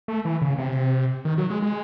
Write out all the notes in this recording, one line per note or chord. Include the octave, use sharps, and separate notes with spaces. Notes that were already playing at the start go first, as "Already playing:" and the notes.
A3
E3
C#3
C3
D#3
F#3
G#3
G#3